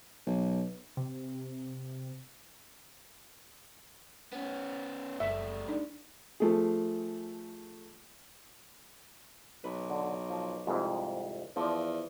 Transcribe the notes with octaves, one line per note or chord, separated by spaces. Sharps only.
B1
C3
B3 C#4
F#1 G3 A3 E5
D4 D#4 D5
F3 A3 G#4
B1 B4
D3
F3
C2 F2 G#2
E2 F3 D5